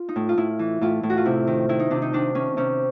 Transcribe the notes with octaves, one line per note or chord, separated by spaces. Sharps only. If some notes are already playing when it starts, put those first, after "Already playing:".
Already playing: F4
D#4
A2
F4
A2 E4
E3
A2 F4
A2
F#4
F4
C3 E4
D#3
D#3 E4
D#4
C3 D4
D#4
D#3 D4
D#3 C#4
C3 C#4